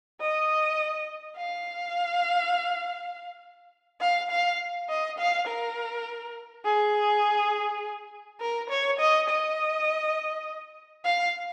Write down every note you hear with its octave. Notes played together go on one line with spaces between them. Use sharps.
D#5
F5
F5
F5
D#5
F5
A#4
G#4
A#4
C#5
D#5
D#5
F5